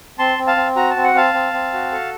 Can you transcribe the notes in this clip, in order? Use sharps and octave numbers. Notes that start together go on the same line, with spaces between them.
C4 A5 C6
C4
F5 A5
C4
F#4 A#5
A5
C4
F#5
C4 F5 A5
C4
C4
F#4
A4